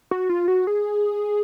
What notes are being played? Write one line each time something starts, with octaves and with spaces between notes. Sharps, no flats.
F#4
F4
F#4
G#4